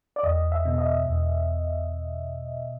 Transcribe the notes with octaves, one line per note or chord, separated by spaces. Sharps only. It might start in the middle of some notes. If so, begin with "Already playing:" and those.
D5
E2 D#5
E5
B2
D#5
E2